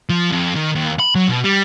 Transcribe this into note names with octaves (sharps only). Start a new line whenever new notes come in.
F3
F2
D#3
D#2
B5
F#3
B2
G3